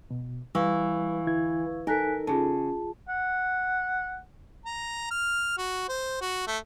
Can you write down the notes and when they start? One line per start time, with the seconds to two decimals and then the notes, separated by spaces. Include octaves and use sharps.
0.11 B2
0.55 E3 G3 F5 C#6 E6
1.27 D2 E4 G#6
1.87 D#4 A4 A#4 G#5 F#6 B6
2.27 C#3 F4 G#4 A5
3.09 F#5
4.65 A#5
5.11 F6
5.58 F#4
5.89 C5
6.21 F#4
6.47 A3